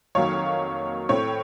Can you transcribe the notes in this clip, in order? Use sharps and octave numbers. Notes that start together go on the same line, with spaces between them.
F2 D#3 F#3 A#3 C#5 F5
A2 A3 C4 C#5